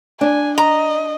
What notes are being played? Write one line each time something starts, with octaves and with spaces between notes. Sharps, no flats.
D4 G#5
D#5 A#5